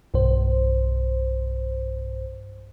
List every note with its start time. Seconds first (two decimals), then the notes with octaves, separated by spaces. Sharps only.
0.14 B1 G2 C5